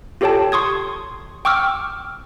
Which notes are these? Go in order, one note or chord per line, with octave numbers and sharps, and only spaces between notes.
F4 G4 A4 C#5 G5 A5
C6 C#6 D#6 G#6
G5 C#6 D6 E6 F6